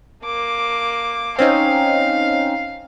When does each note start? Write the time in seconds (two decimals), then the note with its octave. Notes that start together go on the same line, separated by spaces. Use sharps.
0.25 A#3 D6
1.39 C4 C#4 D#4 F5